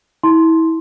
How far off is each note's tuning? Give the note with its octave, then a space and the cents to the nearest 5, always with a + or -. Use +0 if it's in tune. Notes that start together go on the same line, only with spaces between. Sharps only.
E4 -30 C6 +0